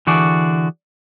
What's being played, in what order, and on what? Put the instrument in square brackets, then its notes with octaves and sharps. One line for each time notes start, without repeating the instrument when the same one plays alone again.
[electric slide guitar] D3 E3 F#4 G#4 D5